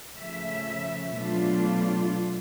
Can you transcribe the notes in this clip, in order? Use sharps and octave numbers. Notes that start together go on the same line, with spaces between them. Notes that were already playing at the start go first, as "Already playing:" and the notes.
C#3 F3 A3 E5
B2 F#3 A3 D4 F4